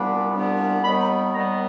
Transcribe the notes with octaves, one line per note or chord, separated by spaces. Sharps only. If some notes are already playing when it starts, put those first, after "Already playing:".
Already playing: C2 A#2 G3 B3 D4
C2 A#2 G3 B3 D4
D#2 D#3 G3 B3 B5
A#5
D#2 D#3 G3 B3 A#5